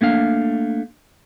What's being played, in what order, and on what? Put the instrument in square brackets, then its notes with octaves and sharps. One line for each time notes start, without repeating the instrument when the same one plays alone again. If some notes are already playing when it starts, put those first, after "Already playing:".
[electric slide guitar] A3 A#3 D4 F5